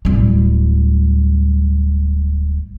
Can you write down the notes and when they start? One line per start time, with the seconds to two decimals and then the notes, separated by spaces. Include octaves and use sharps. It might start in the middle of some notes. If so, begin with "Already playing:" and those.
0.05 D1 G3